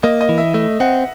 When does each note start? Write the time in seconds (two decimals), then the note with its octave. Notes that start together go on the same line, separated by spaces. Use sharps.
0.03 A#3 D#5
0.21 D#5
0.29 E3
0.38 E5
0.54 A3 E5
0.80 C4 F#5